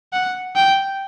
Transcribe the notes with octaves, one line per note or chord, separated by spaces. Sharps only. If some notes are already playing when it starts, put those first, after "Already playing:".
F#5
G5